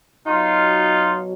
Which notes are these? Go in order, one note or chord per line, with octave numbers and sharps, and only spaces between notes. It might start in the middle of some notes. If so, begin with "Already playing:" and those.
B2 F#3 D#4 F4